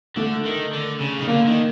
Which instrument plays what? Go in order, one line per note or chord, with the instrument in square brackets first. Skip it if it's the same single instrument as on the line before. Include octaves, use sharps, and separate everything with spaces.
[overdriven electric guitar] D3 [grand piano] A3
[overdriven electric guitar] D#3
D3
C#3
D#3
[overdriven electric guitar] D3 [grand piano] A#3
[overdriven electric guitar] D#3